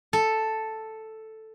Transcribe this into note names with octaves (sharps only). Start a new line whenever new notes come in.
A4